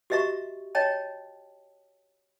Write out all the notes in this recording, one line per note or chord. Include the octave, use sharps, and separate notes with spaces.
F#4 G4 D#5 E5 A#5 C#6
C#5 D#5 G5 A5 A#5